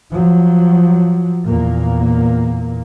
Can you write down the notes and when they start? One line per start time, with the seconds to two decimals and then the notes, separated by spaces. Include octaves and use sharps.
0.11 F3 F#3
1.47 E2 A#2 A#3